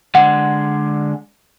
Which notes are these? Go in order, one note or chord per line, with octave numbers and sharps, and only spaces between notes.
D3 G#3 F#5